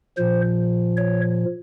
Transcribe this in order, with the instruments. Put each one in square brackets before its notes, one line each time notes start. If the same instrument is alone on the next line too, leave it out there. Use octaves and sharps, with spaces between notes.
[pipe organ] A#2 F3 C5
C#5